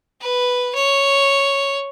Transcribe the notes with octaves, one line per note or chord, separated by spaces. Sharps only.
B4
C#5